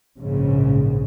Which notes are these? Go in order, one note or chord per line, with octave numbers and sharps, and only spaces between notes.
A#1 G#2 C#3